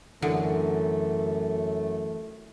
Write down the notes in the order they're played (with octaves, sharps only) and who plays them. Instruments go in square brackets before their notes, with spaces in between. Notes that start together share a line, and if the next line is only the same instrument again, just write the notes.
[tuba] F#2 [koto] D3 [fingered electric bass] E3 [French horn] A3